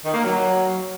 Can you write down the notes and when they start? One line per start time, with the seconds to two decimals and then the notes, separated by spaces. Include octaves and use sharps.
0.04 D#3
0.13 A#3
0.23 F#3